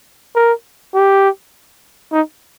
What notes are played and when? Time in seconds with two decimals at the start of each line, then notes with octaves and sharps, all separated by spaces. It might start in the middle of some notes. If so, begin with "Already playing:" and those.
0.35 A#4
0.94 G4
2.12 D#4